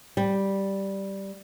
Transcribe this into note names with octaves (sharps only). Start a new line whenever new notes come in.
G3